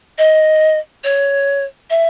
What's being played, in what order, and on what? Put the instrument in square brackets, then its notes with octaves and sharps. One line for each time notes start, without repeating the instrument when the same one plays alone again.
[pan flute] D#5
C#5
E5